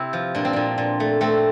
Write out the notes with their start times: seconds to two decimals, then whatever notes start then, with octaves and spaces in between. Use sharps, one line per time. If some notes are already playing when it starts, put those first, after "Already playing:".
Already playing: C3 E4 G4
0.13 F3
0.35 A#2 D4
0.45 C4
0.53 A#2 D4
0.78 A#2
1.00 A3
1.21 A3 C4